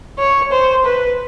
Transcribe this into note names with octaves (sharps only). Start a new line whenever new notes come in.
C#5
C5
B4